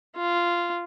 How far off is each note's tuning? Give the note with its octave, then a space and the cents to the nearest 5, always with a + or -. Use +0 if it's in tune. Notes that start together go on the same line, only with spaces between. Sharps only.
F4 -10